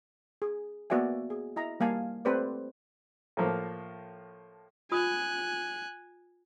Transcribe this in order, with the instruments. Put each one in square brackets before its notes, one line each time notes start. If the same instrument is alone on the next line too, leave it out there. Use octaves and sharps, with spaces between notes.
[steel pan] G#4
A#3 B3 F#4 D5 E5 G#5
G#4
E4 D#5 A#5
G3 A#3 F5 G#5 A5
A3 C4 G4 B4 C5 D5
[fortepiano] A2 F3 A#3
[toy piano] F4 D#6 [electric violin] G#5 F#6